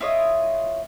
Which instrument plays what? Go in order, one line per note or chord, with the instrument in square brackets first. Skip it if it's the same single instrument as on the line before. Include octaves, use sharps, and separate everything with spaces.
[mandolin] E4 F4 C#5 D#5